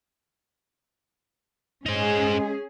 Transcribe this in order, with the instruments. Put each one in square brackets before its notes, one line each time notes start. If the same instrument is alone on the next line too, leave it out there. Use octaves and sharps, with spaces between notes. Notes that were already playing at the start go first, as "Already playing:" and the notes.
[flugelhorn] G#3 [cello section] C#4 G#4 [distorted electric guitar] D#4 C5